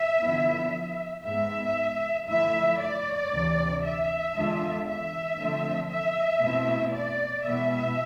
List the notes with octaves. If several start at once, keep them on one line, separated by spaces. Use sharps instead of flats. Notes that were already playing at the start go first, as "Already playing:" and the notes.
Already playing: E5
D3 F3 B3 E4
G#2 G#3 B3 E5
D3 F3 A3 E4 E5
D5
D2 C3 E3
E5
E2 D3 G#3 D4 F4
E5
D3 F3 A3 C4
E5
B2 A3 C4 E4
D5
B2 G#3 B3 E4 E5